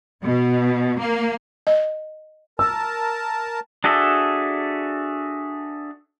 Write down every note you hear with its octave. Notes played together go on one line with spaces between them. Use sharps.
B2
A#3
D#5
A#4 A5 E6
D4 F#4 G#4 A4 E5